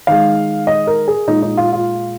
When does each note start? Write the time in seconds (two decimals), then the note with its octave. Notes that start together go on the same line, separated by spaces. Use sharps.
0.07 D#3 G#3 F5
0.67 D#5
0.87 A#4
1.08 G#4
1.27 A#2 G#3 D#4
1.42 D#4
1.57 F4
1.73 F4